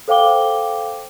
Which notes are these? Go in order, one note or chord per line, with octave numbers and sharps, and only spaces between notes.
A4 C5 F5 G5 D6 G7